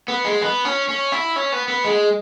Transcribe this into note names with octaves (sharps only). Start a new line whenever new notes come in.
B3
G#3
B3
C#4
C#4
E4
C#4
B3
B3
G#3